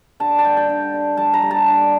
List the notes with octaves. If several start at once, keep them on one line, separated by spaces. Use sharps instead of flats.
D3 A5
A5
G3 G5
G5
D3
D3
G3 A5
A#5
G3
A5
D3